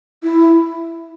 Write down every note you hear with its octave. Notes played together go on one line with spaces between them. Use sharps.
E4